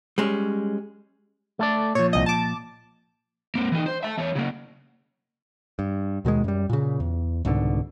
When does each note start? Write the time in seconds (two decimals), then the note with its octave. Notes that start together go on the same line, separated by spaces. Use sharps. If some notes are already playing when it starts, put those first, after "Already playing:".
0.18 G3 G#3 C#4
1.59 A3 A4 D5
1.95 A#2 F3 C#5
2.13 C2 D#5
2.26 A5 D6
3.55 A#3 C4
3.72 E3 D#4
3.86 C5
4.03 E5 A5
4.18 E2 C#5
4.35 C#3 A#3
5.79 G2
6.25 D#2 B2 D#3 G#3
6.44 F#2 G3
6.70 A#2 C#3
7.00 E2
7.45 C2 G#2 B2 D3